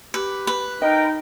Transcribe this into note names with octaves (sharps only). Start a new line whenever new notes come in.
G4 B4
B4
D#4 A#4 D#5 G5